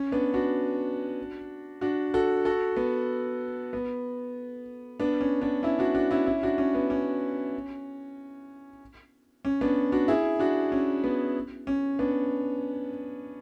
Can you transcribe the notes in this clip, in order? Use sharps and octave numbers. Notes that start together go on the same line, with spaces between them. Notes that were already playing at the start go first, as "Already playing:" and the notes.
Already playing: C#4
B3 D4
D4 F#4
D4 F#4
F#4 A4
F#4 A4
B3
B3
B3 D4
C#4
B3 D4
C#4 E4
D4 F#4
D4 F#4
C#4 E4
C#4 E4
D4 F#4
C#4
B3
C#4
C#4
B3 D4
D4 F#4
E4 G#4
D4 F#4
C#4
B3
C#4
B3 D4